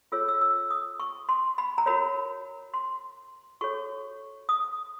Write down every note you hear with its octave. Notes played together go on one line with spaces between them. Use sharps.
F4 A4 C#5 E6
E6
E6
D#6
C#6
C6
B5
A#5
F#4 A#4 C#5 B5
C6
F#4 A4 C#5 C#6
D#6